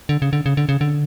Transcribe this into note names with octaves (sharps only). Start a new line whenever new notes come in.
D3
C#3
D3
C#3
D3
C#3
D3